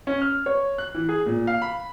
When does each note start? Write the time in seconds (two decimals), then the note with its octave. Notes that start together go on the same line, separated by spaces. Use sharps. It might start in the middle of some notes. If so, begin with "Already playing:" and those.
0.07 C#4
0.22 F6
0.46 C#5
0.78 F#6
0.95 E3
1.09 G#4
1.26 A#2
1.47 F5
1.62 B5